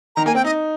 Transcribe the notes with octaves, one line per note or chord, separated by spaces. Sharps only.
D#3 A#5
A#3 G#5
C4 G5
D#4 D#5